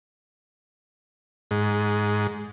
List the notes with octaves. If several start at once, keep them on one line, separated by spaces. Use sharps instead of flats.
G#2